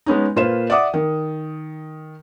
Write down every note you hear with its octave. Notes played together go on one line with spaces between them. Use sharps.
G#3 B3 C#4 D#4
A#2 F4 B4 C5 E7
D5 E5 F#5 D6 D#6
D#3